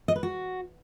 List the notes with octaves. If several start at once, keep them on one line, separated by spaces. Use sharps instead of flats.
D#5
B4
F#4